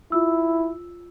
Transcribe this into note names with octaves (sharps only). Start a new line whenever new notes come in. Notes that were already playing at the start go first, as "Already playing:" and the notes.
E4 F4 E6